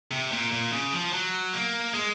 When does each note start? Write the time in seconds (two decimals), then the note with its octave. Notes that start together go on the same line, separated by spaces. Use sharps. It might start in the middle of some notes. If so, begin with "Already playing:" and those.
0.11 C3
0.32 A#2
0.51 A#2
0.72 C#3
0.93 F3
1.13 F#3
1.53 A#3
1.94 G#3